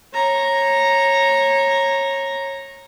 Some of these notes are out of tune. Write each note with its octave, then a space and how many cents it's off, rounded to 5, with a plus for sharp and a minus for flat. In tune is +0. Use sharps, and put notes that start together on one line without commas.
C#5 -20 A#5 +0